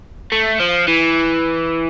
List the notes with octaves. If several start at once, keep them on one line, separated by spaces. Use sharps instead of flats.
A3
F3
E3